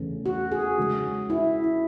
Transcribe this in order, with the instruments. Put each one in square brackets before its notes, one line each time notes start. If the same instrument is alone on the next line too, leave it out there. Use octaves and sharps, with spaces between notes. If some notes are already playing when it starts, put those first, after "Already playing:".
Already playing: [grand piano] E2 C#3 E3 A3 C#4
[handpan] F#4
G#4
[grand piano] C#3 G#3 C#4 F#4
[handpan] E4